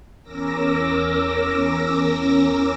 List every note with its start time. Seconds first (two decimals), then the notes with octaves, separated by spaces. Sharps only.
0.22 E2 C#4 A#4 D6 E6 A#6